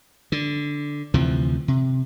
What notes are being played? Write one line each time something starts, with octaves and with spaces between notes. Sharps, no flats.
D3
D2 C3 E3 F3
C3